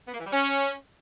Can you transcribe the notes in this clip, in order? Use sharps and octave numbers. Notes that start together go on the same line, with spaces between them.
B3
A#3
E3
G3
C#4